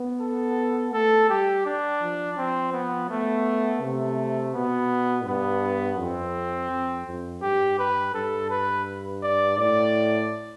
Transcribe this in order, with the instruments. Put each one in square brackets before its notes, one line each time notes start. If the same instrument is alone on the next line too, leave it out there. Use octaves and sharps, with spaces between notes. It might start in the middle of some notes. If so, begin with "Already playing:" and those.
Already playing: [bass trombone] B3
[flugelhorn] A4
[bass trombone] A3 [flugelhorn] A4
[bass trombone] G3 [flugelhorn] G4
[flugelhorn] D4
[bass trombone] F3
[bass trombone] F3 [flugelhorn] C4
[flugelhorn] B3
[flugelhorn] A3 [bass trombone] B3
[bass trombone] C3 [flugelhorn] A3
[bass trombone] B2 [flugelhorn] B3
[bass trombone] G2 [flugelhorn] B3
[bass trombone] F2 [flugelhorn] C4
[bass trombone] F2
F2
[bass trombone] G2 [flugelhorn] G4
[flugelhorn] B4
[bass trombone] G2 [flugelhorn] A4
[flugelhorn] B4
D5
[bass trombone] A2 [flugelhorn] D5